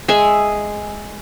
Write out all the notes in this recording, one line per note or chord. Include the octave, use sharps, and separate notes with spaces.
G#3 G#4 E5 G#5